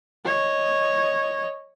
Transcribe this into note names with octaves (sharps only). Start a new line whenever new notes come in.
C#5 D#5